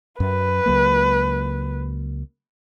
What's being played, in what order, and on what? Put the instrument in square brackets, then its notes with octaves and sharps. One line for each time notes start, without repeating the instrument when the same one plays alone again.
[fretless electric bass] F#2 [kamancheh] B4
[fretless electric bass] C#2 F#3 A#3